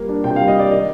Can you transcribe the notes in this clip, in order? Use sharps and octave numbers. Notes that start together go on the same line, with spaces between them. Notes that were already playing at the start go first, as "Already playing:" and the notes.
Already playing: G3 A#3
D4
C3 G5
F5
G3
D#5
A#3 D5
D#3 D#5